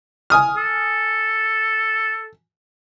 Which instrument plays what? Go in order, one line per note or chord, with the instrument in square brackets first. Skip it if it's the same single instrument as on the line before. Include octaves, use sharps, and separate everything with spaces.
[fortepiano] G#5 D#6 F6
[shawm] A4